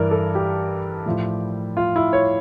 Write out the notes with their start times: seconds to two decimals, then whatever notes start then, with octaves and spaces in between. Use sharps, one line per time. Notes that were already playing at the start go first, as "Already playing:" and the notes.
Already playing: G2 E3 A#4 D5
0.11 A4
0.35 G4
1.06 A2 F3
1.77 F4
1.96 E4
2.13 C#5